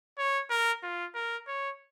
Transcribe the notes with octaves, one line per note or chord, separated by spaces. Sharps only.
C#5
A#4
F4
A#4
C#5